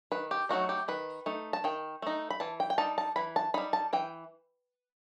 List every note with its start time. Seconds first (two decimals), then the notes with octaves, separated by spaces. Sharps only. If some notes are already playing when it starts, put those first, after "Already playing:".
0.12 D#3 B4
0.31 G4
0.49 F#3 A3 D#4 F#4
0.69 G4
0.88 D#3 B4
1.26 A3 D#4
1.53 A5
1.64 D#3 G5
2.02 A3 D#4
2.30 B5
2.40 E3 A5
2.60 G5
2.70 G5
2.78 G3 D#4 A5
2.98 A5
3.16 E3 B5
3.36 A5
3.54 G3 D#4 B5
3.73 A5
3.93 E3 G5